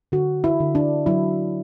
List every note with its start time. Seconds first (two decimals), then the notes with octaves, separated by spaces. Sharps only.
0.12 D3 F#4
0.44 E4
0.60 D3
0.75 D4
1.06 F#3 E4